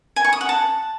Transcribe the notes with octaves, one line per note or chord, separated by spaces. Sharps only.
G#5
C#6
D#6
F#5
A5